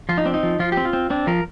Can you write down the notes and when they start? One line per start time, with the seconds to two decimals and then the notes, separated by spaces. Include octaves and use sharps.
0.09 F3 F4
0.18 D#4
0.25 C4 D4
0.34 D#4
0.43 F3
0.59 F3 F4
0.72 G4
0.77 C4
0.85 F4
0.93 C4
1.10 C4 D4
1.27 F3 A#4